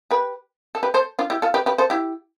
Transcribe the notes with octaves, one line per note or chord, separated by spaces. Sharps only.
G4 B4
A4
G4 B4
A4 C5
D4 F4
E4 G4
F4 A4
G4 B4
G4 B4
A4 C5
E4 G4